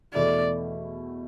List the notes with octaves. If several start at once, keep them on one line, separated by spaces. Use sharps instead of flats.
E2 B2 A3 E4 D5